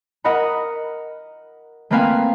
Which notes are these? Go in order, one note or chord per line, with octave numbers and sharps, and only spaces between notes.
A#4 D#5 F#5 B5
A3 A#3 C4 B4 F5 G#5